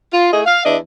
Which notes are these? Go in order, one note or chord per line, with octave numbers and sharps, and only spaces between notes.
F4
A3 E4 G#4 D#5
F5
E2 D4 D#5 E5